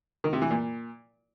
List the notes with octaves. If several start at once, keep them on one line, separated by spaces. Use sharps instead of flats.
D#3
C3
E3
A#2